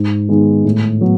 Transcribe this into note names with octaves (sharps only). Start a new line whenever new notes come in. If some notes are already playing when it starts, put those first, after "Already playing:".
Already playing: G#2
D#3 G#3 B3
A2
F#3 B3